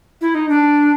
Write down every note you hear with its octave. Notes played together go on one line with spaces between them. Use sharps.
E4
D#4
D4